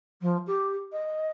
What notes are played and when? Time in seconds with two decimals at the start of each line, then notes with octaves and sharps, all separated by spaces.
0.21 F3
0.47 G4
0.92 D#5